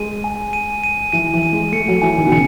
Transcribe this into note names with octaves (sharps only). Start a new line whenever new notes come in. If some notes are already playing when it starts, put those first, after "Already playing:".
Already playing: G#3 D#7
G#5
D#7
D#7
E3 D#7
E3
D#7
G#3
A3 C#7
F#3
E3 G#5
D#3
B2
C#3 C#7